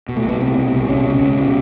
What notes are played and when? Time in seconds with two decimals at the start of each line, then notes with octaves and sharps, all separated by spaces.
0.09 B2
0.17 A3
0.25 C2 B3
0.41 B2 C4
0.58 C2
0.74 C2
0.89 B2 C#4
1.06 C#2
1.22 C#2
1.37 B2